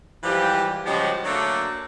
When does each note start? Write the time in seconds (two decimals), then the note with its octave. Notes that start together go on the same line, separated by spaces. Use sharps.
0.23 G#2 E3 F3 G3 G4
0.85 C#3 F3 G3 G#3 F#4 G4
1.23 D3 F#3 A3 A#3 D4